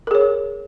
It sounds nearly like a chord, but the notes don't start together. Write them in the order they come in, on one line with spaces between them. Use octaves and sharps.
A#4 G#4 C#5